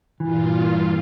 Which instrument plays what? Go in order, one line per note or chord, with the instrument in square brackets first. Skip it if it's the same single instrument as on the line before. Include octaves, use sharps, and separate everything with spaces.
[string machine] G2 A#2 F4 [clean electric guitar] E3